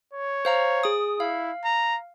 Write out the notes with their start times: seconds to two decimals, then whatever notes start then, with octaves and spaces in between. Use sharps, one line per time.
0.13 C#5
0.45 C5 F5 A#5
0.83 G#4 D#6
1.20 E4 F5
1.65 A#5